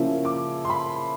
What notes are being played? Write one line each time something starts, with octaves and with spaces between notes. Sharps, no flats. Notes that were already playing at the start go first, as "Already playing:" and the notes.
Already playing: C#3 F3 A#3 C#4 E4
D6
C6
B5